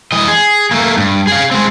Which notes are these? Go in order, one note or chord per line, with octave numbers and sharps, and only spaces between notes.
E3 D#5
G#4
A3 A#3
G2
G#4 F5
G#3 C4